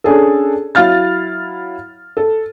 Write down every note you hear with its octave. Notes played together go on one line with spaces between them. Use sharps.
C#4 D4 G#4 A4
F#3 E4 F5 F6 A6
A4